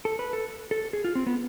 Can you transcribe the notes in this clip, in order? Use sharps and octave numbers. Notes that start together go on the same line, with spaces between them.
A4
B4
A4
A4
G#4
F4
C4
B3